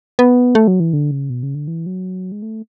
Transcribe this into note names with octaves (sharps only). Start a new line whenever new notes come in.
B3
A3
F#3
E3
D3
C#3
B2
C#3
D3
E3
F#3
G#3
A3